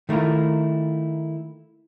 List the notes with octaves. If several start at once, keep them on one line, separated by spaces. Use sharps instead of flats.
D#3 A3 A#3 E4 F4